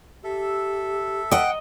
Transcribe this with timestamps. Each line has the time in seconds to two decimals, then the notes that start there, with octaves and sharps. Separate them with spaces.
0.24 G4 A4 E5
1.31 D#5 F#5 G5